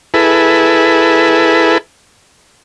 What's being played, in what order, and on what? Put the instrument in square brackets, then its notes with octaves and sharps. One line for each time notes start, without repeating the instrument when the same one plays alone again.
[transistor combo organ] E4 G#4 A4 B4